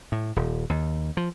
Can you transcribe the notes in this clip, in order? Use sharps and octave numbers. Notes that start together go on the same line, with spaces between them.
A2
D#1
D#2
F3